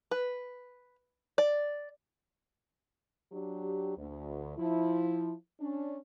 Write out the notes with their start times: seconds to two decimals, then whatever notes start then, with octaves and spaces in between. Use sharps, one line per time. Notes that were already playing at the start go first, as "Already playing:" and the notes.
0.11 B4
1.38 D5
3.32 F#3 D4 G4
3.97 D2
4.58 F3 E4
5.60 C#4 D4